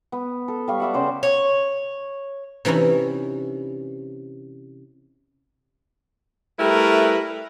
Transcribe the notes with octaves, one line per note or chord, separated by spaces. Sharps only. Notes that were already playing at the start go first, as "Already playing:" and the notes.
B3
A4
G3 F5 C#6
D5 E5 F#5
C#3 C5 D6
C#5
C3 E3 C#4 D#4 E4
G3 A3 E4 A#4 B4